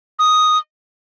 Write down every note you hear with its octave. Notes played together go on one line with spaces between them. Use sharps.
D#6